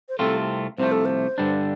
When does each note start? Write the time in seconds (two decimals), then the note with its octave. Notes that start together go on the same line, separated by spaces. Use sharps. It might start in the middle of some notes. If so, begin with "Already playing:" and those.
0.09 C5
0.19 C2 C3 A3 C4 F4 A4
0.78 C2 C3 F3 A3 C5
0.92 A4
1.05 C5
1.38 G2 D3 G3 D4